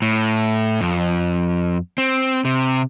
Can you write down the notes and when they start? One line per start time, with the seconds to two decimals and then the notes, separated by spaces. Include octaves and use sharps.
0.02 A2
0.81 F2
1.98 C4
2.45 C3